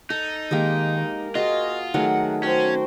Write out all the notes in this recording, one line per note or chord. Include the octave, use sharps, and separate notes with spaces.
D#4 A4
D#3 G#3 A#3 G4
A#4
F4 F#4 G#4 D#5
D#3 F#3 A3 G#4 F#5
C#4 F#4 C5 G5